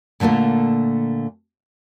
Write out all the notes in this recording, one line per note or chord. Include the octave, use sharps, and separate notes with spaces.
A#2 D3 A3 A#3 F4